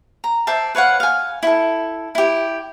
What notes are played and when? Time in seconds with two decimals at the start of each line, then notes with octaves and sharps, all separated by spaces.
0.24 A#5
0.47 C5 D5 E5 A5
0.75 B4 C#5 F5 F#5
1.00 F5 G#5
1.43 E4 A4
2.15 E4 G4